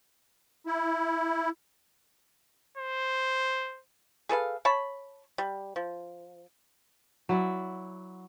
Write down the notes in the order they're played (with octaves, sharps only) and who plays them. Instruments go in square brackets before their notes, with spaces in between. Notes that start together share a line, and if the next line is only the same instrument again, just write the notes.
[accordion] E4
[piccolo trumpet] C5
[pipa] G#4 A4 B4 F5
C#5 A5 B5
G3
F3
[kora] F#3 E4 D5